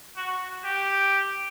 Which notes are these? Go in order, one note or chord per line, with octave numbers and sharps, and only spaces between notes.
F#4
G4